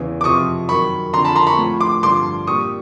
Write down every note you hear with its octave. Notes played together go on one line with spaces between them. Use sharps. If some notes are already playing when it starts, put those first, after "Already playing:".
Already playing: E2 C#3 E3
D6
F2 C3 F3 C#6 D#6
F#2 D#3 F#3 B5 C#6
F2 D3 F3 A#5 C6
A5 B5
A#5 C6
B5 C#6
A2 F3
C6 D6
G2 D3 F3 C6 D6
A#2 G3 C#6 D#6